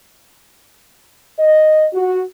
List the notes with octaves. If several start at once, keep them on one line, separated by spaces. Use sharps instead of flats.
D#5
F#4